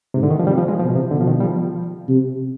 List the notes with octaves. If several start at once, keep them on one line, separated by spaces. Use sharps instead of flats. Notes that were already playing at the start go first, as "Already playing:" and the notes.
G#2 C3
D3
D#3
F3
C3 G3
F3
G#3
B2 F3
B2
C3
B2 D3
F3
D#3
G3
F3
C3